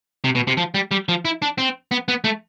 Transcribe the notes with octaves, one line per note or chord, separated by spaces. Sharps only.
C3
B2
C3
F3
G3
G3
F3
E4
D4
C4
B3
B3
A3